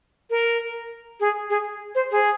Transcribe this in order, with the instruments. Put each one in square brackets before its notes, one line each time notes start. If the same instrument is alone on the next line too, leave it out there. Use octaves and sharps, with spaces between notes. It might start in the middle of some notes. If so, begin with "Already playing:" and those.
[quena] A#4
G#4
G#4
C5
G#4